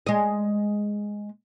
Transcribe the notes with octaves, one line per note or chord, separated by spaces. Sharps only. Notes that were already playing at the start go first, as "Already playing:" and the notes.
G#3 D#5